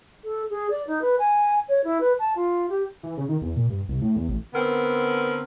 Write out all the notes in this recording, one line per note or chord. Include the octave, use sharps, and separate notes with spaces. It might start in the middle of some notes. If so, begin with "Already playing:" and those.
A4
G#4
D5
D#4
B4
G#5
C#5
E4
B4
A5
F4
G4
E3
C#3
D#3
E2
A#2
G2
C2
A2
E2
A1
D3 B3 C4 A#4